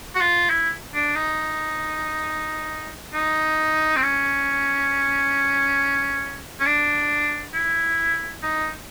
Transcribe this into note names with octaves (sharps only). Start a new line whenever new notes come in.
F#4
F4
E4
D4
D#4
D#4
C4
C#4
C#4
D4
E4
D#4